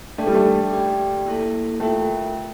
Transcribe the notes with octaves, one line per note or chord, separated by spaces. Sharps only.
A3 D4 A4 D5 G5
G3
A3
G4 D5 G5
A#3 E4 A4
A3 F4 A#4 E5 G5